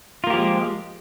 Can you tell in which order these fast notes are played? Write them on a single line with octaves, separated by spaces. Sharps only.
F4 A#3 G4 F3 G#3